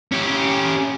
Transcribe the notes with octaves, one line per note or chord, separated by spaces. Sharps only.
C#4 G4